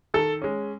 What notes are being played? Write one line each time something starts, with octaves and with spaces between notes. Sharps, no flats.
D#3 A4
G#3 C#4